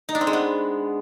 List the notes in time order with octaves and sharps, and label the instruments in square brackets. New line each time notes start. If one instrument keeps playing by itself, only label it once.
[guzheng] D#4
D4
C4
G#3
B3